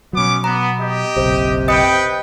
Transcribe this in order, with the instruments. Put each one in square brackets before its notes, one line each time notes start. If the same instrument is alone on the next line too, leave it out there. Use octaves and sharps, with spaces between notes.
[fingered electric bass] B2 F#3 [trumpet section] B3 C#4 D6
[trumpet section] B3 [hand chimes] A#5
[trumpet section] G4 D#5
[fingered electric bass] F#1 B1 [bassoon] C3
[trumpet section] B4 G5 [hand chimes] D#5 D#6 C#7